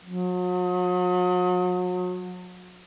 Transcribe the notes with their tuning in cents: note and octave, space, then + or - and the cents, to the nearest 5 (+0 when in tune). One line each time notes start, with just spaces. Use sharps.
F#3 -40